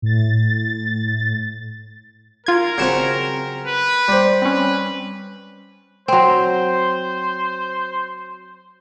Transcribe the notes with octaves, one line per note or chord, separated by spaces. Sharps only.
A2 A6
F4 A#4 G#6
C#3 F#3 C4 G#6 C#7 E7
B4
G3 C5
C4 C#4 B4
F#3 C4 C5